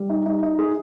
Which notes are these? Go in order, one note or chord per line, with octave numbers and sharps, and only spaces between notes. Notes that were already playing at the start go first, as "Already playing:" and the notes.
Already playing: G3
D#4
D#4
D#4
G#4